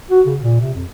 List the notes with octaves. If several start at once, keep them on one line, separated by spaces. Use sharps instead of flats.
F#4
C#3
A#2
C3
F2